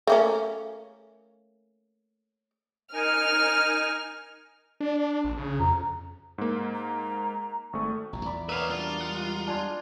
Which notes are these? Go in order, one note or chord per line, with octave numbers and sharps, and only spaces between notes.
A3 A#3 C#4
D#4 A#4 G#5 F6
D4
A#1
C#3
F2 A#5
G#2 A#3
A#5
G#1 A3 C#6
A1 A#2 F3 A#5
E2 D5 B5 D6
A#3 B3 B4 C#5 E5 F5
G3 D4 F4 F#4
G3 G#3 F#5
D4 G#5 C6